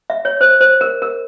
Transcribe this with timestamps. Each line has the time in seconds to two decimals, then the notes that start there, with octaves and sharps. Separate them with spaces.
0.10 E5
0.25 C#5
0.41 C5
0.61 C5
0.81 A#4
1.02 A#4